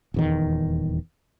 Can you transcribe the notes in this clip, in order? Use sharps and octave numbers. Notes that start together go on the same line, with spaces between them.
D#1 E2 D#3